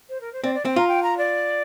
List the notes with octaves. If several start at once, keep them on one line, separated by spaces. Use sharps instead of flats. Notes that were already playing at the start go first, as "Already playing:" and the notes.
C5
A#4
C5
C4 D5
D5
C4 G5
F4 A#5
G5
A#5
D5